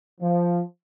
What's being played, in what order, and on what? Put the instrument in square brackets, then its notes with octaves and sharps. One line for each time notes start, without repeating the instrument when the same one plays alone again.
[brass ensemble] F3